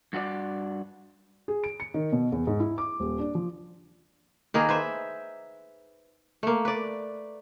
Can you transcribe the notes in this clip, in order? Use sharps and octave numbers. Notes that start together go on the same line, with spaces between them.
G2 F#4 G#4 D5
G#4
D7
C#7
D#3
B2
E2
G#2
E4
D6
D#1
D4
F3
D#3 A#3 G#4 B4
B4 C5 E5
A3 A#3
B4 D5